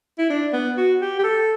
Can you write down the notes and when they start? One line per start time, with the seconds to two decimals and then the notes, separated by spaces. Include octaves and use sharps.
0.18 E4
0.30 D4
0.53 B3
0.77 F#4
1.01 G4
1.19 G4
1.24 A4